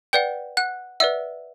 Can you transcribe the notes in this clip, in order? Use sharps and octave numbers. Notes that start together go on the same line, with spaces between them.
B4 D5 F#5 G5 G6
F#5 F#6
B4 D5 E5 F#5 E6